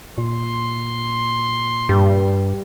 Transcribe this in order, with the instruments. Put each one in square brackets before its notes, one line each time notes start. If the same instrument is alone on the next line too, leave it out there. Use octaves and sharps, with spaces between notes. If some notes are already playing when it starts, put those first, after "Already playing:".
[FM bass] A#2 [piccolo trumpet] C6
[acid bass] G2 [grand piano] G3